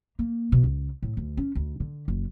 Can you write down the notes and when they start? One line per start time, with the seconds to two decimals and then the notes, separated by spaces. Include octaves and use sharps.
0.19 A#3
0.52 B2
0.64 C#2
1.02 A2
1.17 D2
1.37 C#4
1.55 D2
1.80 D3
2.08 F#1